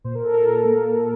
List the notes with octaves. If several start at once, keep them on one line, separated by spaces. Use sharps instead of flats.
A#2 C5
A#4
A4
A#2 A#4
A#3
A#2